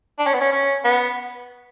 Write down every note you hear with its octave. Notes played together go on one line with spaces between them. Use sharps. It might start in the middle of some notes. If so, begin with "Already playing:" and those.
D4
C#4
B3
C#4
C#4
B3